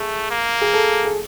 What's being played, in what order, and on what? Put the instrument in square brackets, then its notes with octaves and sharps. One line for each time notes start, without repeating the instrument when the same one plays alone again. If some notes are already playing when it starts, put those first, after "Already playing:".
Already playing: [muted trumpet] A3 [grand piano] G#4
[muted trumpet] A#3
[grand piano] G#4
A4
G#4